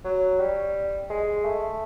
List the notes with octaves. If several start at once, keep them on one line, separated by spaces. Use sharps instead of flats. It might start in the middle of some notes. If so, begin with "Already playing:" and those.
F#3
G3
G#3
A3